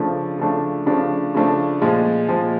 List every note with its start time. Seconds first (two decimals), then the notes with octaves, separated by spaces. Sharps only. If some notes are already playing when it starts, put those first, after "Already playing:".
Already playing: C#3 F3 A3 D4
0.39 C#3 F3 A3 D4
0.86 C#3 F3 A3 D4
1.35 C#3 F3 A3 D4
1.82 A#2 F3 G#3
2.28 A#2 F3 G#3